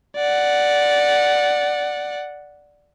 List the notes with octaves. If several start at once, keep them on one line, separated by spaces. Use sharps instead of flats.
D5 F#5